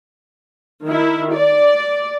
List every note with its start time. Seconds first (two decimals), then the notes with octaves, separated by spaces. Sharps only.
0.87 D#3 E4
1.34 D5